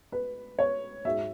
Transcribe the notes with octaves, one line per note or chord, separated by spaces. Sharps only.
B4
C#5
G#2 F#3 E5